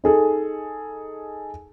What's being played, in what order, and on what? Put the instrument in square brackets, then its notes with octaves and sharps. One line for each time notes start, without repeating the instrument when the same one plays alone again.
[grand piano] D#4 G#4 A4